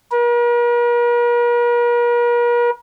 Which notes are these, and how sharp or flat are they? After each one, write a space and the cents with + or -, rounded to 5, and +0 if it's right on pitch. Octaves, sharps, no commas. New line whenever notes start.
A#4 +45